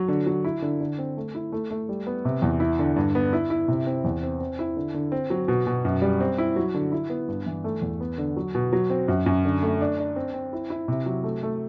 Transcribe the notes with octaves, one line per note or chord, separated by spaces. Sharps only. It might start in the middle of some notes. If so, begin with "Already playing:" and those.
Already playing: F#3
D3
F#3
E4
D3
D3
C4
A3
E4
A3
A3
G3
B3
C3
E2
E4
D3
G2
B3
E4
E4
C3
C4
E2
C4
C4
E4
D3
D3
C4
F#3
B2
B2
F#2
G3
C4
E4
F#3
D3
E4
B3
G2
E3
A3
E2
B3
D3
F#3
B2
F#3
C4
F#2
F#2
D3
A3
D4
D4
C4
C4
E4
E4
C3
F#3
A3
A3